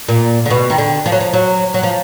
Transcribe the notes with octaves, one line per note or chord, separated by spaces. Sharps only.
A#2
D3
B2
D#3
D3
F3
F#3
F3
F#3
F#3
F3